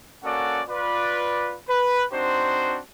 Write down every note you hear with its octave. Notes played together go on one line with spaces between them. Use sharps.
A#3 C#4 F#4 A4 D5 F#5
F4 B4 D5
B4
C4 D4 D#4 F#4 C5